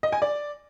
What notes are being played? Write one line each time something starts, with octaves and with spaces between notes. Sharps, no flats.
D#5
G#5
D5